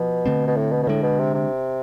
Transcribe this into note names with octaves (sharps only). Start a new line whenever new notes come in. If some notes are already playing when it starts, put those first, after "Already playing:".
Already playing: B2 F3
D3 A3 C4
B2
A2
B2
B2
A2 D3 G#3 D4
B2
C3
C3